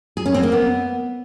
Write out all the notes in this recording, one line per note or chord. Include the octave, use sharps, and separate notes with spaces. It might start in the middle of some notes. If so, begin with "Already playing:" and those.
G#4
C#4
C4
A#3
B3